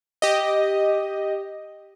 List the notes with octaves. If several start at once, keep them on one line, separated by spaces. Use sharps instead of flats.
G4 D#5